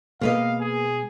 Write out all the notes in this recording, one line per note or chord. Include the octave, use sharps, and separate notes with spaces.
B2 G#3 A#3 B4 D#5 F5
G#4